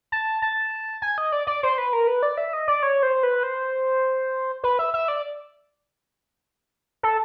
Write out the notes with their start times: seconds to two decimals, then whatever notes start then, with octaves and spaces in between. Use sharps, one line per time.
0.12 A5
0.42 A5
1.02 G#5
1.18 D#5
1.32 D5
1.47 D5
1.63 C5
1.78 B4
1.93 A#4
2.07 B4
2.23 D5
2.37 E5
2.53 D#5
2.68 D5
2.83 C#5
3.03 C5
3.23 B4
3.43 C5
4.64 B4
4.79 E5
4.94 E5
5.08 D5
7.03 A4